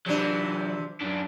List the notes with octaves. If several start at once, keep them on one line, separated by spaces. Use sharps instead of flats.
C3 E3 F#3 D4
F#2 D4